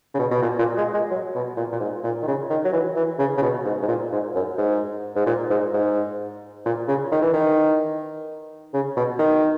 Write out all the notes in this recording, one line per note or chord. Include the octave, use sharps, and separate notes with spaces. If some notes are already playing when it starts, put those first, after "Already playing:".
C#3
B2
B2
A#2
A#2
G#3
G#3
F#3
B2
A#2
A#2
G#2
A#2
D#3
C#3
D#3
F#3
E3
E3
C#3
C#3
B2
G#2
G#2
A#2
G#2
F#2
G#2
G#2
A#2
G#2
G#2
A#2
C#3
D#3
E3
D#3
C#3
B2
D#3